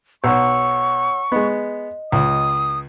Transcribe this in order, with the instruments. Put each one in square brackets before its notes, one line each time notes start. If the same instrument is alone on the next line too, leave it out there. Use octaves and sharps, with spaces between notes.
[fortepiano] B1 [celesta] C#5 F#5 E6 [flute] C#6
[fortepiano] G#3 B3 [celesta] D#5
[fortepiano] C#2 [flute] D#6